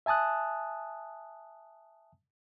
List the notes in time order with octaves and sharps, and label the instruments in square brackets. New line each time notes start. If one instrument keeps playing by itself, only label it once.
[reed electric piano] E5 G#5 A5 D#6 F#6